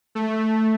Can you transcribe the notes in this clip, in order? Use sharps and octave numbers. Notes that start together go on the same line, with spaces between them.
A3